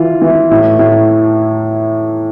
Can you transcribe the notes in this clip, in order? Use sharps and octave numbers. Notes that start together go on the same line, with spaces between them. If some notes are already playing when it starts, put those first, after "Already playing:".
Already playing: E3 F4
E3
A2
A2